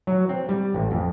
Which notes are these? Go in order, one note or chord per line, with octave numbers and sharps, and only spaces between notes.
F#3
C4
G3
A1
F2